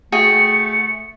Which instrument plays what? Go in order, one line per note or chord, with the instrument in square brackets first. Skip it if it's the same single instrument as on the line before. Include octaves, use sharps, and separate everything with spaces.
[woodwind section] A3 [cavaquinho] F#4 G#4 G5 [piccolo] C#7